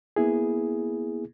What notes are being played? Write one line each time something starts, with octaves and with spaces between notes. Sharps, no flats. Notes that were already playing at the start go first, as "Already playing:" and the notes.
A#3 B3 E4 G#4